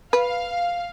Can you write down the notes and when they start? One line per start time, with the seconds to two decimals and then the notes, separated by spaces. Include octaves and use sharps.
0.13 B4 F5